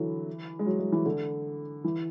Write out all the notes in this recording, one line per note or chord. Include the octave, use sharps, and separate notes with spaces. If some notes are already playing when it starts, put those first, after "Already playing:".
Already playing: D3 E3 F#3
G#3
F#3
G#3
E3
D3
E3